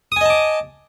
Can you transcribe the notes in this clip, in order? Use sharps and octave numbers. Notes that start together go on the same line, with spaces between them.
D#5 G#5 A5 D6 D#6